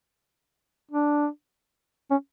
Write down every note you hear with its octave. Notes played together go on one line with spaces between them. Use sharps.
D4
C#4